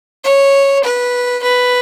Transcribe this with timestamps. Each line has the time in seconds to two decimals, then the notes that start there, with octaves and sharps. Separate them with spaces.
0.24 C#5
0.84 B4
1.43 B4